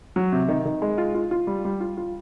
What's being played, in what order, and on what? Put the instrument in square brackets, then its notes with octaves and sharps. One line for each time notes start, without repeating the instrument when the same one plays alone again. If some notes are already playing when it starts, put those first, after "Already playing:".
[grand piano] F#3
C3
D#3
D#3
G#3
F4
F4
F4
G3
G3
F4
F4